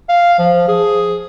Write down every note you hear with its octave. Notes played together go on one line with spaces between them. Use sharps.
F5
F3
G#4